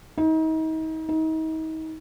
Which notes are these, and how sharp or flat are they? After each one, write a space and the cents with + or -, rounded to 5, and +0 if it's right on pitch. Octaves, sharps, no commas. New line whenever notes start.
D#4 +35
D#4 +35